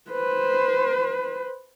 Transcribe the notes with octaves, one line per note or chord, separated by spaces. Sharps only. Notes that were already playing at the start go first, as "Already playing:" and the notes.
B4 C5